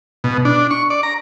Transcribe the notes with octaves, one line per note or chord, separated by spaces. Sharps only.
B2
D4
C#6
D5
A#5